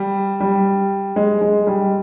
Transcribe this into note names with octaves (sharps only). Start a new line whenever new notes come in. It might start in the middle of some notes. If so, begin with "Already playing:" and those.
Already playing: G3
G3
G#3
G#3
G3